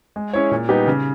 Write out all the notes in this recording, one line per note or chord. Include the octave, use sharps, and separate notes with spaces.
G#3
C#4 E4 G#4 C#5
A#2
G3 B3 D#4 G4
C#3